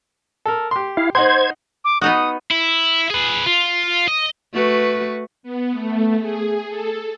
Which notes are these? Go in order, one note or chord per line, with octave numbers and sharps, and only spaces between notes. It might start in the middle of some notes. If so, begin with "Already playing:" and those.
A4 A#4
G4 C6
E4 F5
D#4 C5 F#5 C6 G#6
D6
B3 D#4 F#4 D#6
E4
G#4 B4
F4
D#5
A3 F#4 B4
B3
A3
G#4
A4